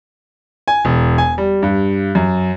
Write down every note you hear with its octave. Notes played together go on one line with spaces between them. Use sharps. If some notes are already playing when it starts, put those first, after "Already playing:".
G#5
E1
G#5
G3
G2
F#2